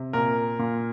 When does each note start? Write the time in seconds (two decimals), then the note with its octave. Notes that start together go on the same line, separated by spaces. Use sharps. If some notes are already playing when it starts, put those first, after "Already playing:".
Already playing: C3
0.13 A#2 A#4
0.59 A#2